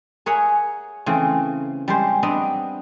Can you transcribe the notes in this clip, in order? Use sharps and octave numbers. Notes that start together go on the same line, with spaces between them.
G#4 A#4 C#5 E5 F#5
C#3 E3 A3 C4
G3 G#3 C5
B3 C4 D4 D#5 E5